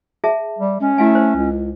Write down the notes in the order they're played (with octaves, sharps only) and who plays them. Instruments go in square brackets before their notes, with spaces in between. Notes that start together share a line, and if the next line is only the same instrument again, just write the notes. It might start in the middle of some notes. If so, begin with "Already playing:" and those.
[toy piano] G#4 E5 A5
[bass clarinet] G3
[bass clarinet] G#3 [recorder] C#4
[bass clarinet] A3 [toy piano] E4 F5 G#5
[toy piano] C5
[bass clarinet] C#2